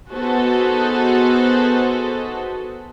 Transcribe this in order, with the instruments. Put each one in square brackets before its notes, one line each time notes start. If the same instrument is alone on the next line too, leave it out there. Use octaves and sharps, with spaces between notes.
[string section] B3 D#4 F#4 G#4 A4 C5